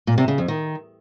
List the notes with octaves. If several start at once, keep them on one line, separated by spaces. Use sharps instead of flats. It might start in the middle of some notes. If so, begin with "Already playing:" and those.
A#2
C3
C#3
F2
D#3